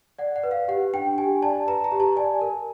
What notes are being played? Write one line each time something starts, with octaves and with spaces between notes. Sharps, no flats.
D5 F#5
F#5
B4
F5
G4 F#5
D4 G5
G4 G#5
D5 A5
B4 A#5
A#5
G4
A5
D5 G#5
A#4